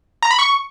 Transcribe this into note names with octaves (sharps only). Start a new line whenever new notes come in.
A#5
B5
C#6